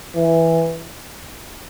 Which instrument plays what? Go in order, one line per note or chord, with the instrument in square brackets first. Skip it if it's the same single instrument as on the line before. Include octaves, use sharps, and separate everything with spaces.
[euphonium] E3